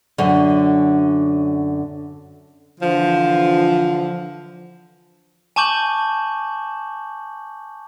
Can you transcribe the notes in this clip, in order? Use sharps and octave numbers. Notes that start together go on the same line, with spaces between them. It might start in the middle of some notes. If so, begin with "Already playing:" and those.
F#2 D3
D3 E3 F3
G#5 A5 C#6 D6 G6 F#7